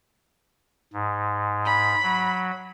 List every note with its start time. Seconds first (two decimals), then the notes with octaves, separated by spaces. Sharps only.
0.93 G#2
1.65 B5
2.03 F#3